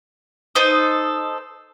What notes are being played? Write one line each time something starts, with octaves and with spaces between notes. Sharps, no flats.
D#4 A4 C5 D#6